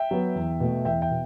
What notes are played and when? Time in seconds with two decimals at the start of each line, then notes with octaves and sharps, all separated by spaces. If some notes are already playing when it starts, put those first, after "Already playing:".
Already playing: E5 G5
0.11 F#3 B3
0.35 E2
0.60 B2 A3
0.85 E2 E5 G5
1.02 E5 G5
1.10 B2